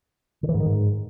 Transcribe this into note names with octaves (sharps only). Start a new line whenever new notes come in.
D3
E3
G#2
D#3
G#2